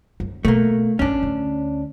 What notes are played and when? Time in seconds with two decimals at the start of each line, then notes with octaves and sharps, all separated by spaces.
0.20 F#2
0.45 B2 A3 A#3
0.99 A1 F#2 C#4 D4
1.23 D2